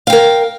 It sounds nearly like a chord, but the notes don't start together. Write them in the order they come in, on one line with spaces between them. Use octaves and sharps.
F5 G5 A#4